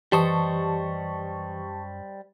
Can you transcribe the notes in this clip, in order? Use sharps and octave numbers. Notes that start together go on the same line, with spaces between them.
F#2 E3 G3 G4 C5 D#5 A5 C#6